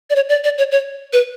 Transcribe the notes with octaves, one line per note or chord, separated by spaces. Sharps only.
D5
C#5
D5
D5
C#5
C#5
B4